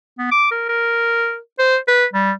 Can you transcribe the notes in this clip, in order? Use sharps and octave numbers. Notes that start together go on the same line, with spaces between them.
B3
D6
A#4
A#4
C5
B4
G3